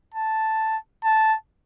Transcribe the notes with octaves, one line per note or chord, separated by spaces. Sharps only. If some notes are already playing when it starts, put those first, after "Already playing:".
A5
A5